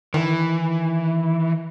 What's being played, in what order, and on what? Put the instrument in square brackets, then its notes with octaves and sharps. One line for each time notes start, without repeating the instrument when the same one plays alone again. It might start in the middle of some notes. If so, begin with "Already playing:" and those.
[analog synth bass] D#3 [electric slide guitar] E3